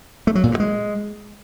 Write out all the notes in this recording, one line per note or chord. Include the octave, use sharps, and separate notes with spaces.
A3
F#3
A#2
G2
G#3